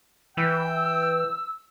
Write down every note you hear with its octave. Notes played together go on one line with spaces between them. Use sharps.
E3 G5 E6